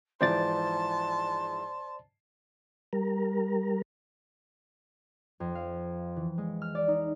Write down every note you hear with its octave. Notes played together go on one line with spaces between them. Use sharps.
G#2 E3 F3 C5 D5 A5 C6 A6
G3 A#4
F2
F5
E3
G#3
F6
D5
D#4